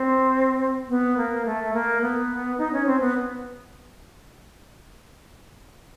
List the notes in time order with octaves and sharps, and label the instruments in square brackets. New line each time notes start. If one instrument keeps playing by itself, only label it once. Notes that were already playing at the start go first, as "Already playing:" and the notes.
Already playing: [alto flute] C4
B3
A#3
A3
A#3
B3
D#4
C#4
C4
B3